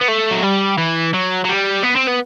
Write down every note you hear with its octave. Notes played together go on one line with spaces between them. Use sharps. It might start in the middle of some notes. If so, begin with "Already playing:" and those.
B3
A3
F#3
G3
E3
F#3
F#3
G3
B3
C4
B3